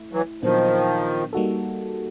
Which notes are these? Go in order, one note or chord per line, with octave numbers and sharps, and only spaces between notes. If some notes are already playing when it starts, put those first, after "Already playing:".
Already playing: A3 E4
E3 F#3
A#2 D#3 F3 F#3 B3 D4
G3 A#3 D#4 F#4 A4